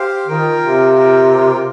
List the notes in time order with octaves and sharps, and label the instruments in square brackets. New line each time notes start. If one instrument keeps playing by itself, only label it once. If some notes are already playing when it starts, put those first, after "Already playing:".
Already playing: [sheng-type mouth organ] G4 C5 F5
[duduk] D#3 [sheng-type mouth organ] F4 A#4 G5
[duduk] C3
[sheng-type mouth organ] F4 A#4 G5